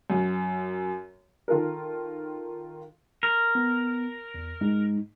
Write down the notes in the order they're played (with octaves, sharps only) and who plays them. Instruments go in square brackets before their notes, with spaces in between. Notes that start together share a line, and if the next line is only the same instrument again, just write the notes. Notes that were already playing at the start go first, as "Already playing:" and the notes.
[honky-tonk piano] F#2
D#3 F4 A4 A#4
[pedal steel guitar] A#4
[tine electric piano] B3
E2
G#2 G#3 D#4